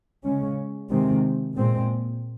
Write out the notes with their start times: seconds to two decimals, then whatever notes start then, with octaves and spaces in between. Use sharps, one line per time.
0.23 C#3 G#3 C#4
0.89 C3 D#3 G#3 C4
1.55 A#2 G#3 C4